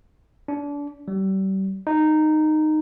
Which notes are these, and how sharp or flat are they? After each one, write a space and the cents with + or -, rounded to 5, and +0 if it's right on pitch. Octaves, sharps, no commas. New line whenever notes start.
D4 -30
G3 -35
D#4 -10